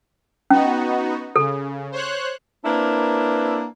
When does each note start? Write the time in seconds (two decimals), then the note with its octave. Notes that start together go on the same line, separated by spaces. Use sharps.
0.51 B3 C#4 D#4 F#4
1.36 C#3 A4
1.92 C5 C#5 F#6
2.64 A#3 C4 D4 E4 A#4 B4